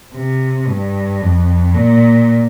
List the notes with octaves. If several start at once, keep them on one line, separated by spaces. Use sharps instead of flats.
C3
G2
F2
A#2